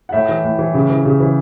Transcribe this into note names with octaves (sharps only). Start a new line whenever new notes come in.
F#5
A2 E5
E3
A2
E3
C#3
E3
C#3
E3